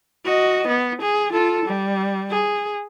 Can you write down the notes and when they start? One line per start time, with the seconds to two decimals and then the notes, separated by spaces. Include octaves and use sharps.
0.25 F#4 D#5
0.68 B3
1.02 G#4
1.32 F4 A4
1.66 G3
2.31 G#4